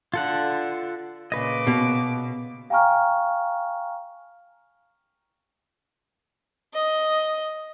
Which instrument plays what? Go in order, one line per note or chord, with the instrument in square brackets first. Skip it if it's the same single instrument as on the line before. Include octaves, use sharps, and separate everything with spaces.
[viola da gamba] D3 [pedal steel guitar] F4 A4 F#5
[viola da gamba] A#2 C#3 [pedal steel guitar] B4 D#5 [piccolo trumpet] D6
[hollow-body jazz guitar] B2
[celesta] F5 G5 G#5 A#5 C#6 F6
[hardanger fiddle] D#5